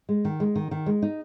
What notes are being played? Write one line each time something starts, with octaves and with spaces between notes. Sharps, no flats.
G#3
D#3
G#3
D#3
D#3
G#3
D#4